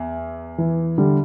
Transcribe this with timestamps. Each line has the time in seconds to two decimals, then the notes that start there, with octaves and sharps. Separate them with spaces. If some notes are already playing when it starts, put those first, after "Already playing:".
Already playing: E2
0.58 E3
0.98 D3 G3